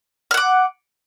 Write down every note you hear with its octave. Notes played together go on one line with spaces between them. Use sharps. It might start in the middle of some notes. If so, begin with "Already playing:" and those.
F#5 D6 F6